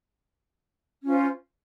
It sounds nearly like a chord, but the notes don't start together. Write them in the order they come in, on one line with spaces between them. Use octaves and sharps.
C#4 F4 C5